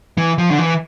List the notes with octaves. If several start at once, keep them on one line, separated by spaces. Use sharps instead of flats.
E3
F3
D3
E3